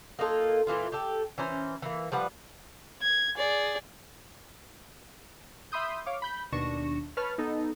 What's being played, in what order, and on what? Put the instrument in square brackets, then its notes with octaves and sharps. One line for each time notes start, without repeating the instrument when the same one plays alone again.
[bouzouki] A#3 D#4 F4 A4
A#2 E3 A#3 F4
G4 A4
E3 C#4 C5 A#5
E3 A#3
F3 G3 B4 F#5
[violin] G#6
G#4 D5
[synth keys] E5 B5 C6 D#6 G6
C#5 F5 D6
B5 G6
D#2 B2 D4 C#6 A#6 E7
B4 C#5 A5 B5 F6
B3 D#4 A4